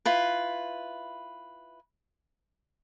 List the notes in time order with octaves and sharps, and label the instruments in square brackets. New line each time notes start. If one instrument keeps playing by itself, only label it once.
[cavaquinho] E4 F4 B4